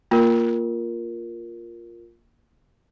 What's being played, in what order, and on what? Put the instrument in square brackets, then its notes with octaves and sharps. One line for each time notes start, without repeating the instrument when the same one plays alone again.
[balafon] A#3 [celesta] F4 A#4